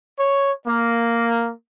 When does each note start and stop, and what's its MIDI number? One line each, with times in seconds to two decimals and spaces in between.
0.17 0.51 73
0.65 1.50 58